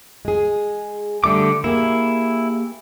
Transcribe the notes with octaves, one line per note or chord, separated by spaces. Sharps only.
G#3 G#4
D3 G3 A3 D6
A#3 E4 G4 G#4